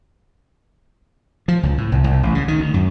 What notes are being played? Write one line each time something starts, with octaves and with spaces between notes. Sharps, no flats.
F3
C#2
A2
C2
C2
A1
C#3
D#3
D2
F#2